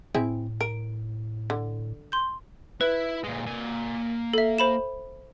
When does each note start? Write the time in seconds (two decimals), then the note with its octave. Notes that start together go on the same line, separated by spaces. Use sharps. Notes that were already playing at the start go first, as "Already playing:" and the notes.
0.14 A2 C4 E4 G#4 G5
0.61 A#4 D7
1.50 D3
2.12 C6 G6
2.81 E4 B4
3.24 A#2 G#3
3.47 A#3 G#5
4.33 A4 E5
4.58 C5 B5 E7